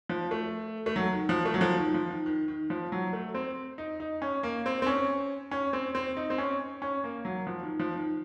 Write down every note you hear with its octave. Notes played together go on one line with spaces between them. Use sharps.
F3
A3
A3
F#3
D#3
F3
A3
F#3
F3
D#3
F3
D#3
D#3
D#3
F3
F#3
A3
C4
D#4
D#4
C#4
A#3
C4
C4
C#4
C#4
C4
C4
D#4
C4
C#4
C#4
A#3
F#3
F3
D#3
F3
D#3